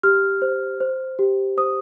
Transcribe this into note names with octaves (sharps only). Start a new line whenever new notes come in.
G4 F6
C5
C5
G4
C5 D#6